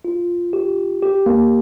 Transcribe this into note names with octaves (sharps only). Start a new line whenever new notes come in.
F4
G4
G4
A#3